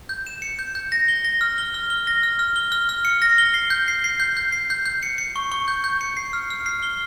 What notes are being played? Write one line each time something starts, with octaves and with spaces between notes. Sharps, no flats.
G6
E7
C#7
G6
G6
A#6
G7
A#6
F6
G7
F6
G7
A#6
F6
F6
G7
F6
F6
C#7
A#6
G7
C7
G6
C7
C7
G6
G6
C7
G6
G6
C#7
C#7
C#6
C#6
G6
G6
C#7
C7
F6
F6
C7
G7